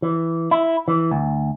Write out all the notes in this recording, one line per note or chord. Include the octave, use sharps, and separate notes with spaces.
E3
E4
E3
D2